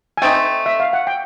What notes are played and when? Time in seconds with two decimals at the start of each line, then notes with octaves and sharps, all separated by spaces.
0.17 G#5
0.22 A3 C4 D#4 G5
0.66 E5
0.80 F5
0.93 F#5
1.07 G5